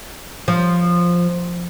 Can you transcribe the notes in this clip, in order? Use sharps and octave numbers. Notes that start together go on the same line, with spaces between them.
F3